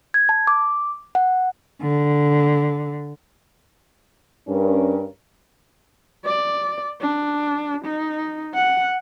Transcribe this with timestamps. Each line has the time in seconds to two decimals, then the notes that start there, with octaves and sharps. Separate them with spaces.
0.14 G#6
0.29 A5
0.47 D6
1.15 F#5
1.81 D3
4.48 G2 C#4 A#4
6.25 D5
7.00 D4
7.85 D#4
8.54 F#5